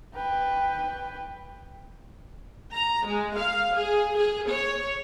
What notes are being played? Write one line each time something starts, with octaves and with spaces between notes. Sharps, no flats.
B4 G5
A#5
G#3
F5
G#4
G#4
C#5